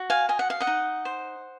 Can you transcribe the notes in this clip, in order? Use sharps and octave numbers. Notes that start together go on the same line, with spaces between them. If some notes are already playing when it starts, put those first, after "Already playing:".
Already playing: F#4
F5 G#5
D#5 G#5
F#5
F5
D#5 F#5
D#4
C5